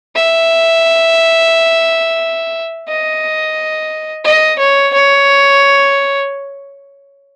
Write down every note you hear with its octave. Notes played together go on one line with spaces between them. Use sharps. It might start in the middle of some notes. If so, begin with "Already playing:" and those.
E5
D#5
D#5
C#5
C#5